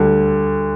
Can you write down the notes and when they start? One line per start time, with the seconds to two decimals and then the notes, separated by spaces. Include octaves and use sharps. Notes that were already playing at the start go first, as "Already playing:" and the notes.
Already playing: D2 D3 G3